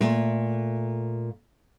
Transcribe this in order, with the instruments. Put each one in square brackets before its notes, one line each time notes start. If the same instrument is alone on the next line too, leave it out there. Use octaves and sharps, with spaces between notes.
[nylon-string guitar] A#2 A3